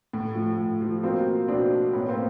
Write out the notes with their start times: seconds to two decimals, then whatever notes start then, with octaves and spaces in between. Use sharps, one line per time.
0.13 A2
0.35 F3
0.58 A2
0.81 F3
1.03 B2 A#3 C4
1.48 B2 C4 D4
1.93 A2 B3 C#4
2.08 A#3 C4